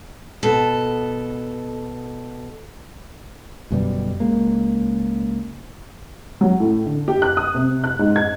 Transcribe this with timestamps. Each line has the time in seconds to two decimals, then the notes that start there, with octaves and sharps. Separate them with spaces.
0.43 B2 A4
3.71 G1 F#2 B2 G3
4.20 C#2 G#3 A#3
6.41 F#3
6.60 A2
6.86 D3
7.08 G4
7.22 F#6
7.37 D#6
7.54 C3
7.84 F#6
7.99 G#2
8.16 G#6